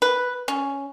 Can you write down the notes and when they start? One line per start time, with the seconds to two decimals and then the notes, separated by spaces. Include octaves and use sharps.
0.02 B4
0.48 C#4